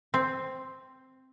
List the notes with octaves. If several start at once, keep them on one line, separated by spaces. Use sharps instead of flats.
C4